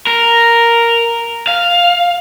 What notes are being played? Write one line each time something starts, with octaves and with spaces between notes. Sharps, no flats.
A#4
F5